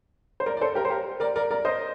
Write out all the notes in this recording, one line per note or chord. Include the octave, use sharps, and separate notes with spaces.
C5
A#4 D5
D5
A4 C5
G4 A#4
C5
G4 A#4
A#4 D5
A#4 D5
A#4 D5
C5 D#5